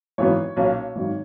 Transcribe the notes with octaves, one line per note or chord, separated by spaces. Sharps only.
G#1 F#2 E3 B3 C#5
B1 A#2 A#3 C#4
G#1 F#2 D#3